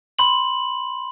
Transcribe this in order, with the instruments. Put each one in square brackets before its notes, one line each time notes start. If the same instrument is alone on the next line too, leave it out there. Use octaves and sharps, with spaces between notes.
[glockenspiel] B5 C6 F#7